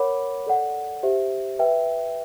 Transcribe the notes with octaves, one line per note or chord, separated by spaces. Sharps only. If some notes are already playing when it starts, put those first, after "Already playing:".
Already playing: A#4 C#5 F#5 B5 D6
A4 D5 F#5
G4 C5 E5
B4 E5 G5